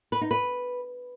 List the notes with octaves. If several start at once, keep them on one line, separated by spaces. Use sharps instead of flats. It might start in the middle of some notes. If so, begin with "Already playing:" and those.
B4
D#4
B4